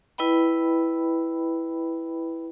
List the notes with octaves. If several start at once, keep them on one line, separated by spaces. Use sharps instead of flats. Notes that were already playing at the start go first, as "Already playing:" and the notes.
E4 B4 D#5 G5 B5